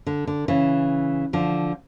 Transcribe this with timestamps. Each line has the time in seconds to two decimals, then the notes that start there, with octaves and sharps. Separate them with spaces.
0.07 D3
0.27 D3
0.48 C#3 E3
1.33 D3 F3